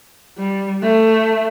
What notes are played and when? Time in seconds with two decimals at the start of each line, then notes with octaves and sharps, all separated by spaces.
0.38 G3
0.82 A3